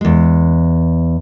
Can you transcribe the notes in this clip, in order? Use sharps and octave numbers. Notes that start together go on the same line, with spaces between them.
E2 G#3